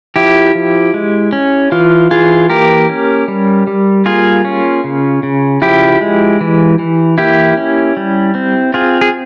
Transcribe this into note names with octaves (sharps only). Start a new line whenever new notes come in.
F3 E4 G4
F3
G#3
C#4
E3 F4
E3 F4 G#4
A#3 G4 A#4
C#4
G3
G3
A#3 F4 G#4
C#4
C#3
C#3
F3 E4 G4
G#3
E3
E3
A#3 E4 G4
C#4
G3
C4
C4 F4 G#4
G#4